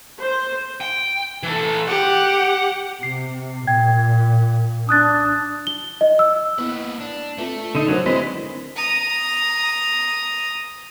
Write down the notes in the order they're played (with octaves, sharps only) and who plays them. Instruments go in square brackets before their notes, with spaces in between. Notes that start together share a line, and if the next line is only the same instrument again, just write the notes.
[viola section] C5
[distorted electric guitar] G5
E3 A4
[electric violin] G4 [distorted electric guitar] F#5
[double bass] C3 [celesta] C7
[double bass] A#2 [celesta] G5 G#6
[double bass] D4 [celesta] D#6 F#6 A6
[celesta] G7
D#5
E6
[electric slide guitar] A#3 B4 [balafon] B3 E4
[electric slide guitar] D4
[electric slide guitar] A3 [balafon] C4 F4 B4
[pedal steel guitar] D3 D#4
[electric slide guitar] D3 A3 [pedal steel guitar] F#3 [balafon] D4 A#4 C5
[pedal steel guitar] G#3 C4 B5 [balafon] E4 B4 C5 [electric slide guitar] D5 D#5
[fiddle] A#5 D#6